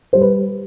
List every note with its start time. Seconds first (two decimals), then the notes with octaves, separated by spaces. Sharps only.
0.13 G3 C5
0.21 B4